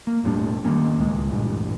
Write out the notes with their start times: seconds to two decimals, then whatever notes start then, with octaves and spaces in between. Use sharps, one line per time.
0.07 A#3
0.24 E1 A2 G3 D4
0.65 D#3 G3 A#3 C#4
0.97 D1 C#2 G#3
1.31 A1 G2 A#2